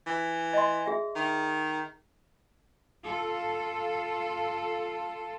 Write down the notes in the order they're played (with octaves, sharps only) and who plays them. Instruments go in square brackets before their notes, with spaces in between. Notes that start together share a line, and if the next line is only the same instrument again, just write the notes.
[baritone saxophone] E3
[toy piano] D#5 C6
G#4 E5
[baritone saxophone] D#3
[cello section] F4 A4